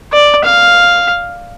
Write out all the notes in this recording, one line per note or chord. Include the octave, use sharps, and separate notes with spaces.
D5
F5